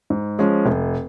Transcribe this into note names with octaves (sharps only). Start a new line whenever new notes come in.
G#2
F3 G#3 C#4
F1